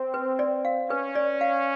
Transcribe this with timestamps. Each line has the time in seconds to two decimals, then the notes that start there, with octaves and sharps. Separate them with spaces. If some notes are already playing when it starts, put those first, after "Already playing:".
Already playing: C4
0.14 B4
0.39 D5
0.65 F5
0.90 C#4 B4
1.15 D5
1.41 F5